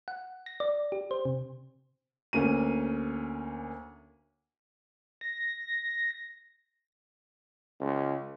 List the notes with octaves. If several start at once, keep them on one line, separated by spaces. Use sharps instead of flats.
F#5
A#6
D5
G4
C5
C3
D2 A#3 C#4 D#7
A#6
C#2